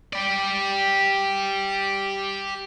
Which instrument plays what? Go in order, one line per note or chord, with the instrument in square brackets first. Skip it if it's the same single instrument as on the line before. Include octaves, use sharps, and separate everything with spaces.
[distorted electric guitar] G4 D5